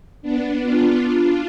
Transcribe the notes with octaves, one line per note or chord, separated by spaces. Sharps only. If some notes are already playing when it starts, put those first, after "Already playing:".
B3 D4
D4 F4
D4 F4